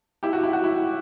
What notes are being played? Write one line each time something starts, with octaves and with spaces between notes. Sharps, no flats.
E4 G4
F#4
E4
F#4
E4